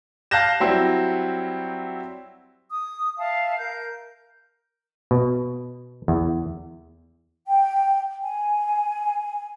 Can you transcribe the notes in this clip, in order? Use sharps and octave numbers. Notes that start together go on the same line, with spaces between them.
F5 A5 F#6 G6 A#6 E7
F#3 G3 C4 E4
D#6
E5 F5 A5
A#4 G6
B2
E2
G5
G#5